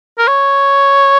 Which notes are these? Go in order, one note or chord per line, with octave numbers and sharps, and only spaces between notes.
A#4
C#5